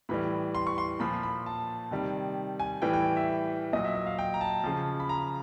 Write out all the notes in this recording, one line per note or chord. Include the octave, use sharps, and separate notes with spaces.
A2 E3 G3 B5
C6
C#6
C6
A#2 F3 B5
B5
A5
C3 D#3 G3
G#5
A2 E3 G3 G5
G5
E5
A#2 F#3 D#5
E5
E5
F5
G5
A#5
A5
C#3 F3
B5
A#5